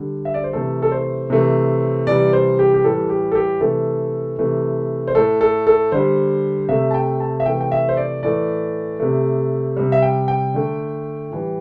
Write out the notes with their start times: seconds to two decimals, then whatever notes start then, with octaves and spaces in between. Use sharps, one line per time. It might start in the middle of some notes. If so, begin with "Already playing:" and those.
Already playing: D3 G3
0.25 E5
0.34 D5
0.44 C5
0.53 C3 E3 A3 A4
0.82 A4
0.92 C5
1.30 C3 E3 A3
2.07 C3 E3 G3 D5
2.33 C5
2.59 G4
2.74 G4
2.84 A2 E3 G3 A4
3.09 G4
3.32 A4
3.35 G4
3.61 C3 E3 A3 A4
4.38 C3 E3 A3
5.07 C5
5.15 A2 A3 A4
5.41 A4
5.67 A4
5.92 D3 G3 C5
6.69 C3 A3 E5
6.91 A5
6.94 G5
7.20 A5
7.40 E5
7.46 C3 E3 A3 G5
7.61 G5
7.72 E5
7.89 C5
7.97 D5
8.23 A2 E3 A3 D5
9.00 C3 A3
9.77 C3 G3
9.92 E5
10.02 G5
10.28 G5
10.54 D3 A3
11.31 A2 E3 G3